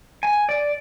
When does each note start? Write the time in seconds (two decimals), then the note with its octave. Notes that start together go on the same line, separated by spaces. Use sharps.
0.23 G#5
0.49 D5